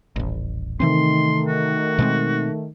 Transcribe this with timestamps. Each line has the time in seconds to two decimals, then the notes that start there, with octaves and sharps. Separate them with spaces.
0.16 D#1 A1
0.80 C3 D#3 E3 A3 C4 C6
1.48 F#4
1.99 B2 G#3 C4